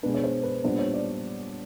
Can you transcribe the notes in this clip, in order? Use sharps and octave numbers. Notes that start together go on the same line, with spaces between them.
B2 G#3 B3 D4 B4
C#5
C5
B4
A#2 G3 B3 D4 C5
C#5
D5